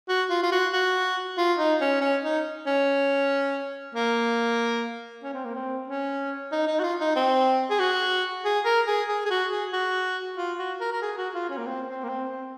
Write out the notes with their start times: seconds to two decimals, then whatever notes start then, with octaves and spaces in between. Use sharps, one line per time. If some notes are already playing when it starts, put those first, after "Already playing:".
0.09 F#4
0.30 F4
0.43 F4
0.52 F#4
0.73 F#4
1.38 F4
1.59 D#4
1.81 C#4
2.01 C#4
2.24 D#4
2.67 C#4
3.95 A#3
5.23 C#4
5.34 C4
5.45 A#3
5.55 C4
5.88 C#4
6.52 D#4
6.67 D#4
6.80 F#4
6.83 F4
7.00 D#4
7.16 C4
7.70 G#4
7.80 F#4
8.45 G#4
8.65 A#4
8.87 G#4
9.09 G#4
9.26 G#4
9.31 F#4
9.52 G#4
9.73 F#4
10.37 F4
10.59 F#4
10.81 A#4
10.93 A#4
11.02 G#4
11.18 F#4
11.34 F4
11.50 C#4
11.58 A#3
11.66 C4
11.88 C4
12.04 A#3
12.09 C4
12.30 C4